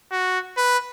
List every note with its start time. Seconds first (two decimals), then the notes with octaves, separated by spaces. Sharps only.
0.12 F#4
0.57 B4